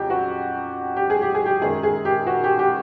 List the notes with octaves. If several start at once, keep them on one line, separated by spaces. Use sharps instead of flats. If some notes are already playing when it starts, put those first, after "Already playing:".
Already playing: F2 C#3 F#3 G4
F#4
G4
G#4
G4
G#4
G4
F#2 D#3 G#3 G#4
G#4
G4
F#4
G4
G4